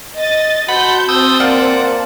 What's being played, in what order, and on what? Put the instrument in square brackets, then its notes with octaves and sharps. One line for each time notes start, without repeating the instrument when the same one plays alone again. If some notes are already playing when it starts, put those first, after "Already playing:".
[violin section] D#5 A6
[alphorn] F#4 [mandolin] C5 [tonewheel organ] F#5 B5 [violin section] A5 G6
[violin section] C4 A5 [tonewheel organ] D#6 E6 G6
[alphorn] A#3 [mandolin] F4 [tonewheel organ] D5 F#5